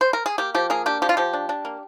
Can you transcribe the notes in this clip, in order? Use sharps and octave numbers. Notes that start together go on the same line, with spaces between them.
C5
A#4
G#4
A#3 G4
F3 G4
A#3 G#4
D4 G4
F3 G4
F4
F3 G4
D4
D4
A#3